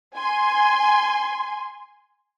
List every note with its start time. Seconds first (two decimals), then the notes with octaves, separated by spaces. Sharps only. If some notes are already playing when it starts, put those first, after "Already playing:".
0.16 G#5 C6